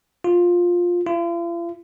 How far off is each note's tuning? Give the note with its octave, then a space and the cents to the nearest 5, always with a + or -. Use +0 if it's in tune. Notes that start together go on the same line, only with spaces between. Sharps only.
F4 +10
F4 -45